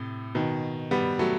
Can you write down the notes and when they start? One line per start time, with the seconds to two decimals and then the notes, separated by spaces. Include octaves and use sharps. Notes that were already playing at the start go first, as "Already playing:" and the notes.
Already playing: A2 C3
0.35 B2 D#3
0.91 G3 B3
1.19 F#3 A3